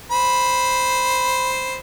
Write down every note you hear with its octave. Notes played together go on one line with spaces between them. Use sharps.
C5 B5